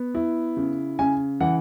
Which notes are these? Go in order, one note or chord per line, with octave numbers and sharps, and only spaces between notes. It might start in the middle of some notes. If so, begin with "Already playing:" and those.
Already playing: B3
E4
C#3
C#3 G#5
E3 F#5